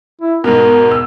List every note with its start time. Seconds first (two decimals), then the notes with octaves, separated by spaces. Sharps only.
0.21 E4
0.44 G#2 B2 A#4
0.92 E6